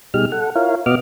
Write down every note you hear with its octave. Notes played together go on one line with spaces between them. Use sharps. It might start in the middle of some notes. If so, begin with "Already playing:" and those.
B2 G3 D#4 G4 G#4 F6
A4 F#5
E4 F4 A#4 C#5 F5
B2 B3 F#4 D#5 D6 F6